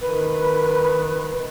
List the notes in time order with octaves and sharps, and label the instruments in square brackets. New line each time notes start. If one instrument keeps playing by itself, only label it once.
[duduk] D#3 [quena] B4